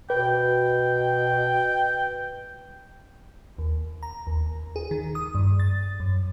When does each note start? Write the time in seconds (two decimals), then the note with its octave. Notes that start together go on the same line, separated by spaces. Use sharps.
0.10 B2 B4 G5
3.58 D#2
4.03 A#5
4.27 D#2
4.76 G#4
4.91 D#3
5.15 D#6
5.35 G2
5.60 A6
6.00 F#2